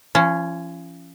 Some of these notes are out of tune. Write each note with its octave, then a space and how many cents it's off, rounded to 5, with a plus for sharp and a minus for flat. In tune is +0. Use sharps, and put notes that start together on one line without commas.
F3 -35 C#4 +0